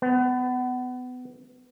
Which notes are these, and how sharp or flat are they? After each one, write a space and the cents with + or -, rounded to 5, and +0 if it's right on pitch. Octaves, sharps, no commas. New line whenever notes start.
B3 +25